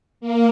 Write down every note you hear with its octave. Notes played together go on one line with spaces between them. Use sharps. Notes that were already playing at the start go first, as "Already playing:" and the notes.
A#3